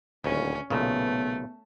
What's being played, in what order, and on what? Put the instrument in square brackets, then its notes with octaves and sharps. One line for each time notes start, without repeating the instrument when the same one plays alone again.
[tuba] D#1 [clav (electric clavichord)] D2 [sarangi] C#4
[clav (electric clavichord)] B1 A#2 C#3 [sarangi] A3 [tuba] B3